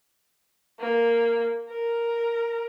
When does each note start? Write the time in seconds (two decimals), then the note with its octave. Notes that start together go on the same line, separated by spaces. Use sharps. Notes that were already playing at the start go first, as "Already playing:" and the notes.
0.80 A#3
1.69 A#4